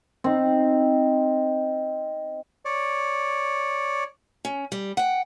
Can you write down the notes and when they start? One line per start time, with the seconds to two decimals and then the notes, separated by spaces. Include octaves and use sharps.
0.24 C4 D#4
2.65 C#5 D5
4.45 C#4
4.72 G3
4.97 F#5 G5